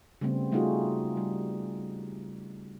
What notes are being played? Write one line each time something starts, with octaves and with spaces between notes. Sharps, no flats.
C#3 G3 A3 B3 C4
G3 A3 D#4 F4 F#4 G#4
G3